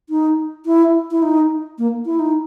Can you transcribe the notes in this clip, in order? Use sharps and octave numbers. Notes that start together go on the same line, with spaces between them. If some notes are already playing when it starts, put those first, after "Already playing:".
D#4
E4
E4
D#4
A#3
E4
D#4